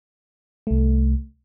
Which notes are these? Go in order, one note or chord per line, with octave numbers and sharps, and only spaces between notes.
C2 A3